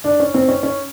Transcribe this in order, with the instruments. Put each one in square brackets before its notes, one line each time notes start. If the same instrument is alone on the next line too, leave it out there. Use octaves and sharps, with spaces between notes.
[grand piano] D4
C#4
C4
C#4
C#4